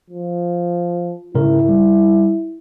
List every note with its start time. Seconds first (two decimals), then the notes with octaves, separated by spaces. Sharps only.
0.10 F3
1.35 G#2 C#3 E4 A#4
1.69 G3